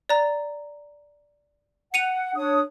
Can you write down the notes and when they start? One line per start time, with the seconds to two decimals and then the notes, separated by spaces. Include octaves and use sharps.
0.09 D5 A#5
1.94 F#5 C#7 D#7 F7
2.36 D4 C#5 D#6